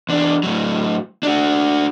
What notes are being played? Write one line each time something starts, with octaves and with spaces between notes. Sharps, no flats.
E2 D4
A2 F#3
D4 F#4